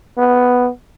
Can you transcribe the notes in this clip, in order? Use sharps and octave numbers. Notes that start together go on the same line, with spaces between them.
B3